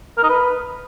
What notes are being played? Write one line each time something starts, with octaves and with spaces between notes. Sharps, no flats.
A#4
D#4
B4